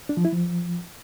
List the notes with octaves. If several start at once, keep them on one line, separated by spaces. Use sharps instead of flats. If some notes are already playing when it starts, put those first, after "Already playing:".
D4
F3
E4
F3